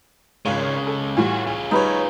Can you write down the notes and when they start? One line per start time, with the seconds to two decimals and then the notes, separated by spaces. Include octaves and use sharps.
0.46 G#1 C#3 G#3 F4 C#5
0.87 A4
1.17 A2 E3 G3 F4 F#4
1.47 F4 G#4
1.71 G3 D#4 B4 C#5